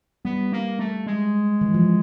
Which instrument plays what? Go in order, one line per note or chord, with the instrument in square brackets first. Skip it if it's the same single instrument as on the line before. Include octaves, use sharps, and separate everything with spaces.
[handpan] G3 [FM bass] B3
[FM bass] A#3
A3
G#3
[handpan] E3
F3